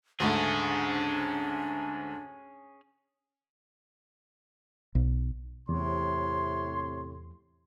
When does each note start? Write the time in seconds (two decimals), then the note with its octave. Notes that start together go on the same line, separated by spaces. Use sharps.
0.20 D2 G#2 A3 C#4 D4 G#4
4.95 B1
5.69 E2 A2 C3 C#5 C6